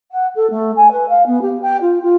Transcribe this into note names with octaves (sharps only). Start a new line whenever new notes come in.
F#5
A4
A3
G#5
B4
F5
B3
G4
G5
F4
F4